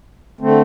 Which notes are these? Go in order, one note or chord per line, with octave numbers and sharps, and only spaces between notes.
D3 A3 C4